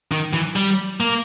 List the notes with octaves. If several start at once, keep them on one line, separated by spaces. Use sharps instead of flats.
D#3
E3
G3
A#3